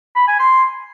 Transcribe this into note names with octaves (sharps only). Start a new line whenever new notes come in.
B5
G#5
C6